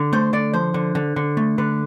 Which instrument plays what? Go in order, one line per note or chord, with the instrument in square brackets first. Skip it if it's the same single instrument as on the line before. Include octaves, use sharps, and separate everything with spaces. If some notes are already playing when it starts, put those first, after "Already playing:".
Already playing: [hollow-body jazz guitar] D3
A3 C5
D3 D5
F3 C5
D3
D3
D3
A3
D3 B4